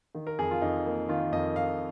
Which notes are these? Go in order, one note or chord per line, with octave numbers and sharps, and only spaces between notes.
D#3
A#4
F2 G#4
F4
F2 D#4
A#3
D#3 F4
F2 D#5
F2 F5